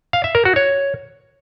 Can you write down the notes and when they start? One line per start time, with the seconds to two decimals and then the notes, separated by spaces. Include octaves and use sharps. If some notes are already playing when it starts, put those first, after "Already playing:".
0.13 F5
0.24 E5
0.35 A#4
0.45 F#4
0.56 C#5